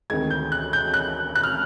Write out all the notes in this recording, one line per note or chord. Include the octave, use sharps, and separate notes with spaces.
D2 C3 D#3 G#3 G#6
G6
F#6
G6
F#6
F#6
F6